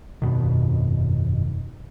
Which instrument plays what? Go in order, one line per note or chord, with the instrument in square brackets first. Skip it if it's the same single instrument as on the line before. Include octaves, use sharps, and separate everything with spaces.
[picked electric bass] G1 F2 B2 D#3